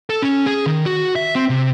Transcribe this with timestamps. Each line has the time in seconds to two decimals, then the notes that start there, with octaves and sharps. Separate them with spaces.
0.10 A4
0.22 C#4
0.46 G#4
0.66 D#3
0.86 F#4
1.16 E5
1.35 C4
1.50 C3